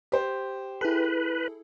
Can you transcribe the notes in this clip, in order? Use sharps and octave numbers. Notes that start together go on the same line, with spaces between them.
G4 C5
E4 G#4 A4 B4